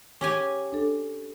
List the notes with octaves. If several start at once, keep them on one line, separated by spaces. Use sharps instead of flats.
C#4 G4 G#5 D6
D4 A4